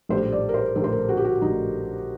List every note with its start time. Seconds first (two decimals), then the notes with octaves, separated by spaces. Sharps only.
0.09 A#1 A2 G3 C5
0.32 D5
0.49 A#4
0.54 C5
0.76 A#1 A2 G3 A#4
0.84 C5
0.92 A#4
1.09 F#4
1.17 G4
1.24 F#4
1.42 A#1 A2 G3 D#4